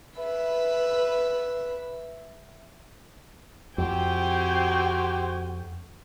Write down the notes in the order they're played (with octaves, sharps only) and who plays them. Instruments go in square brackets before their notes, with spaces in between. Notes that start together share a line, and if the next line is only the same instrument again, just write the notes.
[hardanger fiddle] B4 E5
[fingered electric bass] F2 [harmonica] C4 G4 C5 [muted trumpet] F#4 [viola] G5 G#5